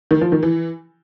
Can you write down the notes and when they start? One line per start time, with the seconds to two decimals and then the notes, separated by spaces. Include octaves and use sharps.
0.11 D#3
0.21 F3
0.32 D#3
0.43 E3